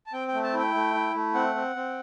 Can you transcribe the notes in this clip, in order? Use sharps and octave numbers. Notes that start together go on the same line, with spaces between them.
A5
C4 G5
G5
A3
A5
E4
G5
A3
E4
A3
C4 F#5
C4
C4